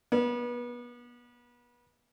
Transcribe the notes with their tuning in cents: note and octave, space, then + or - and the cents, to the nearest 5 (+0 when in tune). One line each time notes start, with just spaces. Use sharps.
B3 -30